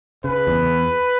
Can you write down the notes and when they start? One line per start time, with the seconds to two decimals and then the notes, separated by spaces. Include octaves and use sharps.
0.24 C#3 B4
0.47 E2